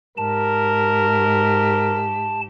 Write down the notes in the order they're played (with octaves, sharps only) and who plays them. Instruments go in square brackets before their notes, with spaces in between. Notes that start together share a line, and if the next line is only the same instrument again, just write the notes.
[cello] G#2 G4 [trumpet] A#4 [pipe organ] A5